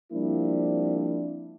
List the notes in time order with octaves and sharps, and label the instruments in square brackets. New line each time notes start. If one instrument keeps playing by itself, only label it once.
[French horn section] F3 G3 A#3 C4 D4 E4